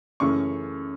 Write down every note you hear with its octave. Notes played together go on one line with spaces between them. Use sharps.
F#2 C#3 E3 A3 C#6